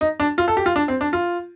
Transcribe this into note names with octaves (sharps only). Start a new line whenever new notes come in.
D#4
D4
F4
A4
G4
F4
D4
C4
D4
F4